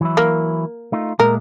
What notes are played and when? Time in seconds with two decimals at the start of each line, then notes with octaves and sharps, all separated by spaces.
0.01 E3 F#3 E4
0.17 A#3
0.92 A3 D#4 F4
1.20 A#2 G#3 A3 A#4